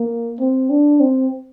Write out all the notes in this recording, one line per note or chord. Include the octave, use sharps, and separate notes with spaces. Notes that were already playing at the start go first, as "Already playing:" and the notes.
Already playing: A#3
C4
D4
C4